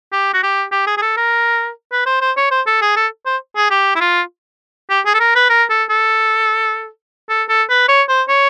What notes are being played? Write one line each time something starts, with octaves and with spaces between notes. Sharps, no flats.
G4
F#4
G4
G4
G#4
G#4
A4
A#4
B4
C5
C5
C#5
C5
A4
G#4
A4
C5
G#4
G4
E4
F4
G4
G#4
A4
A#4
B4
A#4
A4
A4
A4
A4
B4
C#5
C5
C#5